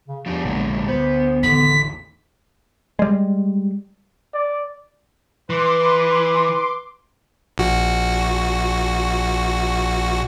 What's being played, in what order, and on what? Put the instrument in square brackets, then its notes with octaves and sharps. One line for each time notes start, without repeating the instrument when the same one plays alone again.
[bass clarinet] C#3
[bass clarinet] E2 [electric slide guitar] F3 D4 G4
[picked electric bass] A#1 A#2 [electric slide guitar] D3 F#3 G#3
[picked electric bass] D2 [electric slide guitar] B3 [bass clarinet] C5
[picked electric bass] A1 E2 D#3 [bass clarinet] D3 [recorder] B6
[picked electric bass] G3 G#3
[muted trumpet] D5
[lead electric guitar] E3 [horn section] B4 [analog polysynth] C6 D6
[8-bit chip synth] A#1 F#4